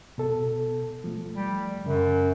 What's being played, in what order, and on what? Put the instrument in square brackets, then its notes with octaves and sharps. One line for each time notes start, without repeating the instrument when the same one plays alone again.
[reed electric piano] B2 A4
F3 A3
[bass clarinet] G3
[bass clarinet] F#2 [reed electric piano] C#3